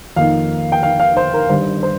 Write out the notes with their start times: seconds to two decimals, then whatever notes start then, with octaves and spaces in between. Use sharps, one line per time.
0.16 F2 D#3 A#3 D#4 F5
0.72 G5
0.83 F5
1.00 F5
1.17 C5
1.34 A#4
1.49 G1 G2 D#3 G3 C5
1.83 C5